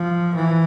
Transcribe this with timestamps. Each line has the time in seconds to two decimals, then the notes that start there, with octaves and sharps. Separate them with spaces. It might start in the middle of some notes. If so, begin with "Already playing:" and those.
Already playing: F3
0.35 E3